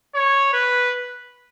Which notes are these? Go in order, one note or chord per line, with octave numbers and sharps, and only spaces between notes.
C#5
B4